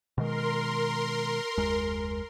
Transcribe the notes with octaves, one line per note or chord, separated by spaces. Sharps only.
B2 D#3 G#3 A#4 C6
F#1 D#2 G#3